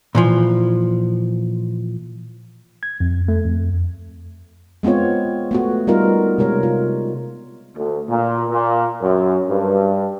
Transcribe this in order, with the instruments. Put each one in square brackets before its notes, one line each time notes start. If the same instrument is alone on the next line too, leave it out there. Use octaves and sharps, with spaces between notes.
[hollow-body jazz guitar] A#2 E3 F3
[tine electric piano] G#6
F2
A3
F2
[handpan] G#3 B3 C4 F4 C#5
A3 B3 F#4
G3 B3 D#4 F4 A#4 D#5
C3 G#3 A#4 C#5
F4
[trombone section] D2
A#2
A#2
F#2
G2